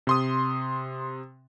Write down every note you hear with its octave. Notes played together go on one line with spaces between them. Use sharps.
C3 C6 D#6